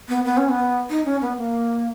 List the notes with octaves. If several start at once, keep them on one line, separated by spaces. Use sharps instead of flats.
B3
B3
C#4
B3
D#4
C#4
B3
A#3